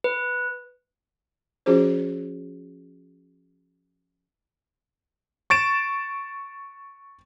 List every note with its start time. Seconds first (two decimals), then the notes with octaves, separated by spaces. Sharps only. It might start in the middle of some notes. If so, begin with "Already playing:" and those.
0.04 B4
1.66 F3 C#4 F4 F#4 G#4 C5
5.50 C#6 A6 D7 E7